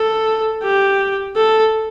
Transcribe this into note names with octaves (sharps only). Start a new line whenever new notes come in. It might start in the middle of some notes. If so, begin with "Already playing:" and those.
Already playing: A4
G4
A4